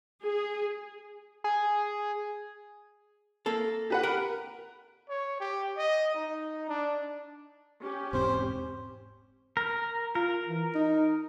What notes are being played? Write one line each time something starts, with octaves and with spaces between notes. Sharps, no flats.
G#4
G#4
A#3 A4
G4 B4 F#5
A#4
C#5
G4
D#5
D#4
D4
C#4 G4
E1 G#2 C4 C5
A#4
F4 A#4
E3
D#4